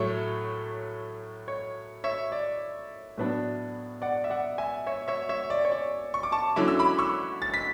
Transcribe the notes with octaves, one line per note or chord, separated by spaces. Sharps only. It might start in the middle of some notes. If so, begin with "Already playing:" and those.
Already playing: A2 F#3 A3 C#5
C#5
C#5 E5
D5
A2 F#3 B3 D4
D5 F#5
E5
D5 F#5
E5 G#5
C#5 E5
C#5 E5
C#5 E5
D5
C#5
D5
C#6
D6
A5 C#6
D3 F#3 C#4 E4 D6
E6
B5 D6
C#6 E6
A6
B6